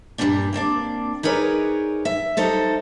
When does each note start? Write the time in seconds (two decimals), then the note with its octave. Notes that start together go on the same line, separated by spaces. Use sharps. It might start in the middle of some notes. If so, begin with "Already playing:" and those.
0.18 G2 A#2 G3 A#3 C4 D4
0.53 A#3 C4 D4 D5
1.23 D#4 G#4 A#4 B4 C#5 D5
2.05 E5
2.37 G3 D#4 A4 C5